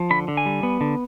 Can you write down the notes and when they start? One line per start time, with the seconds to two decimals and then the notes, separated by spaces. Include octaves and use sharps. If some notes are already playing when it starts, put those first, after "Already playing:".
Already playing: F3
0.10 D3 B5
0.28 D3
0.37 G#5
0.46 G3
0.63 B3
0.81 D3